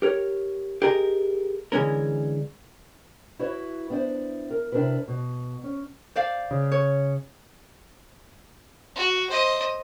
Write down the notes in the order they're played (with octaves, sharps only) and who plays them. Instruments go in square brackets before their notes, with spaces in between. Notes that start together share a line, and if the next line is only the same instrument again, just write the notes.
[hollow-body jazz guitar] G4 A#4 C#5
G4 G#4 A#4 D#5 A#5
D3 E3 G#3 C#4 A#4
[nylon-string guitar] E4 F#4 B4 C#5
B3 D4 E4 C5
A#4
C3 D4 E4 A#4 B4
B2
C#4
[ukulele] C5 D5 F5
[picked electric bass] C#3
[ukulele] C#5
[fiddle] F#4
C5 D#5